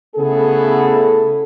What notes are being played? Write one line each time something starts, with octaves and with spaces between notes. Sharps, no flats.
C#3 A3 B3 E4 G#4 A4